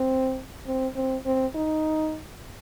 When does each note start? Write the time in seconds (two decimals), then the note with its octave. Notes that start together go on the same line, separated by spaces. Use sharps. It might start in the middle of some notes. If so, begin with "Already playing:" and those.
Already playing: C4
0.67 C4
0.96 C4
1.26 C4
1.55 D#4